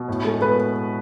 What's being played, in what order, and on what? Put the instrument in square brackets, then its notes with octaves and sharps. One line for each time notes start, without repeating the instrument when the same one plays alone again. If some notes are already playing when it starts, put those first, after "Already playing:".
Already playing: [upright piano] B2
A2
[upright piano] G#3 [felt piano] A4
[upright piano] B3 [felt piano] B4